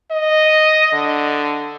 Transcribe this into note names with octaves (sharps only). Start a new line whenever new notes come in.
D#5
D3